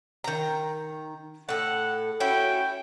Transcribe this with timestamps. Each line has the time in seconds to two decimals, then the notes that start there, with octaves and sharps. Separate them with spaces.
0.24 D#3 A#5
1.49 A2 A4 F#5
2.20 C#4 E4 F#4 G5